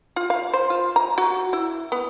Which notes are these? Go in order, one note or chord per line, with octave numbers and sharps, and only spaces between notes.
F4
F5
C5
F4
A#5
F#4
E4
B3